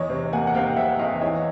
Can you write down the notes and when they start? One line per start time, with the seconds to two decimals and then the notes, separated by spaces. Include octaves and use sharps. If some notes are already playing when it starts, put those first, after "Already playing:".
Already playing: E2 C#5 D#5
0.10 C3
0.33 A#3 F#5 G#5
0.47 F#5
0.55 C3 F5 G5
0.76 C3 E5 F#5
0.99 E2 D#5 F5
1.21 E3 C#5 D#5